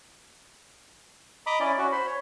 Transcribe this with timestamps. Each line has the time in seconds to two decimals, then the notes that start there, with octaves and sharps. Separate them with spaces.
1.47 D#5 A#5 B5 D6 D#6
1.60 C#4 E4 D5
1.78 C#4 F#4
1.92 C5 B5
2.07 C#5